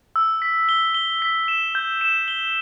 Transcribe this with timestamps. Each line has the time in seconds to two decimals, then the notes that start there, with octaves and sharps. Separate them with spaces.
0.16 E6
0.42 B6
0.69 G7
0.94 G7
1.22 B6
1.48 E7
1.75 G6
2.01 E7
2.28 G7